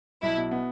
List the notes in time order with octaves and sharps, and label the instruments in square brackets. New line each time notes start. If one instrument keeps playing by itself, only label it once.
[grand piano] B1 [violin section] E4
[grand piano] B2
B3